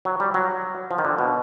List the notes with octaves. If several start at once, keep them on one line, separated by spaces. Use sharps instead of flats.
F#3
G3
F#3
F3
D#3
D3
B2